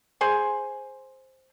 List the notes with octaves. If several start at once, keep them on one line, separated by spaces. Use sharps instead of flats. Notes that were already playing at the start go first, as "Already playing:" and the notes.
G#4 C5 G#5